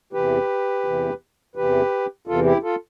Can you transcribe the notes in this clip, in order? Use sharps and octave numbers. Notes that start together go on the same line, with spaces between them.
E2 C3 E3 G4 B4
E2 C3 E3
E2 C3 E3 G4 B4
E2 C3 E3 F4 A4
E4 G4
F4 A4